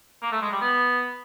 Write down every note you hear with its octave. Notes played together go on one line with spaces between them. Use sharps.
A#3
A3
G#3
G3
B3